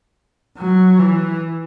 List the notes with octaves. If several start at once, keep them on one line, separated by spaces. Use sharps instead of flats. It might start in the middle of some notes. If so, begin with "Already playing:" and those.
F#3
E3